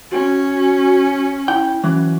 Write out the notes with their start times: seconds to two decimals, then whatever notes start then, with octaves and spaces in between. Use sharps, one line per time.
0.12 C#4 F#4
1.48 E4 G5
1.84 E3 F#3 C#4